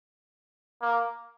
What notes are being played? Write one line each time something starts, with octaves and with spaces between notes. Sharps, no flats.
A#3